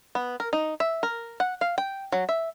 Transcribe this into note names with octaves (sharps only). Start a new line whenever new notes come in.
B3
A#4
D#4
E5
A#4
F#5
F5
G5
F#3
E5